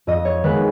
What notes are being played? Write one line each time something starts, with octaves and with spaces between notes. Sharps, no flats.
F2 D#5
C#5
D#3 G#3 B3 B4